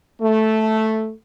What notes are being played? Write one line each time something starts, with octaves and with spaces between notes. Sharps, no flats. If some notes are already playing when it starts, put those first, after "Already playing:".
A3